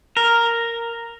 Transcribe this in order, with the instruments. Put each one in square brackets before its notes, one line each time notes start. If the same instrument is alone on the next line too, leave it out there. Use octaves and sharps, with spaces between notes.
[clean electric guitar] A#4